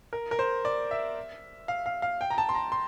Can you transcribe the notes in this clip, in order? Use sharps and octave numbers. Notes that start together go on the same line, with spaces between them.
A#4
A#4
C5
D5
E5
F5
F5
F5
G5
A#5
A5
C6
A#5
C6